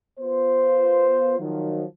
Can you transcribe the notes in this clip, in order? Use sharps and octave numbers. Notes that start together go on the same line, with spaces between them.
B3 F4 C5
D#3 F3 F#3